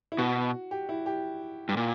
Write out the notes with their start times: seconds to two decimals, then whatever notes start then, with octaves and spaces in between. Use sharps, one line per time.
0.12 E4
0.18 B2 F#4
0.71 G4
0.89 E4
1.06 G4
1.69 G2
1.77 A#2